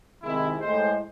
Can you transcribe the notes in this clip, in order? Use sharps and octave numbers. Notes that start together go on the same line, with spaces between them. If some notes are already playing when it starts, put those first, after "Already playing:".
C3 D#3 G#3 E4
A2 G#3 C5